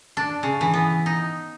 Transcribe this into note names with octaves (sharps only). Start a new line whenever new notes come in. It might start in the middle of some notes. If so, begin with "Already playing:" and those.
D4
C#3
E3
B3
D#4